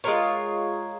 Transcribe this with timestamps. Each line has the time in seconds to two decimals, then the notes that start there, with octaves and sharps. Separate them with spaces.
0.04 G#3 F4 A#4 C#5